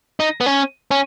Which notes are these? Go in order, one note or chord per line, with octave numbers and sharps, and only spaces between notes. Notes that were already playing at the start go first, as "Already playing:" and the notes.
D#4
B3
C#4
C#4